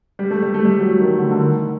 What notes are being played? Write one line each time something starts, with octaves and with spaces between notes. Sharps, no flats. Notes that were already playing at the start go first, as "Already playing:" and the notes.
G3
A3
G3
A3
G3
F#3
D#3
D3
D3
D#3